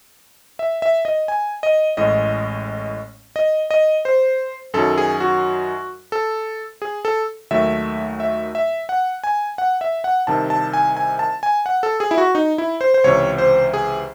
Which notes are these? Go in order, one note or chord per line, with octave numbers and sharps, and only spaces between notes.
E5
E5
D#5
G#5
D#5
A1 A2 G#3 D#5
D#5
D#5
C5
F#2 D#3 F#3 A4
G#4
F#4
A4
G#4
A4
D#2 D#3 F#3 A3 E5
E5
E5
F#5
G#5
F#5
E5
F#5
C2 C3 D#3 A5
A5
G#5
G#5
A5
G#5
F#5
A4
G#4
E4
F#4
D#4
E4
C5
C5
C#2 C3 E3 C#5
C5
G#4